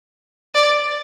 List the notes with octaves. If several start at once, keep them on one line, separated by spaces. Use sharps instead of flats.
D5